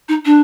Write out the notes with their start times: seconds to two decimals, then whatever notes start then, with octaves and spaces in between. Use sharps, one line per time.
0.08 D#4
0.25 D4